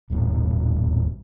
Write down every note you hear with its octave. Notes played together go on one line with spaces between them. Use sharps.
D#1 A1 G2